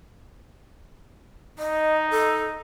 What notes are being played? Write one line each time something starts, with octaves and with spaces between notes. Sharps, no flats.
D#4 D#5
A4